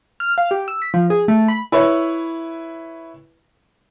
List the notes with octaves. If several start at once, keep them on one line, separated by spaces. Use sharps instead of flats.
F6
F5
G4
E6
B6
F3
G#4
A3
B5
E4 B4 C#5